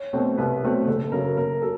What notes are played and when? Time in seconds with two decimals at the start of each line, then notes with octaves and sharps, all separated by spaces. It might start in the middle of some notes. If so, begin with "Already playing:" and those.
Already playing: C#5
0.13 B2 F#3 A3 C4
0.38 C2 B4
0.63 B2 F#3 A3 C4
0.88 F#1 A4
1.12 F#2 C#3 F#3 A#4
1.37 F#1 A#4
1.62 F#3 A4